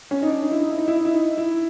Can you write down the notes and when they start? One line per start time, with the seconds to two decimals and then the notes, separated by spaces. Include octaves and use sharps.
0.11 C#4
0.22 D#4
0.27 D4
0.43 D#4
0.52 E4
0.60 D#4
0.70 E4
0.78 D#4
0.88 E4
0.96 D#4
1.05 E4
1.14 D#4
1.37 E4